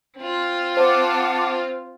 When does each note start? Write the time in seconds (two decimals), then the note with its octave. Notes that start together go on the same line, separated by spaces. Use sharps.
0.17 C4 F4
0.77 C5 F#5 A5 D6